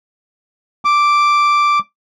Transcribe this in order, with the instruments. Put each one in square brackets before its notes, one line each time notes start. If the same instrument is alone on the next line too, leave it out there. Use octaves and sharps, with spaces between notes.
[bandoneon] D6